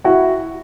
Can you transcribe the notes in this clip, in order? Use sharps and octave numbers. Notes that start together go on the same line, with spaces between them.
E4 F#4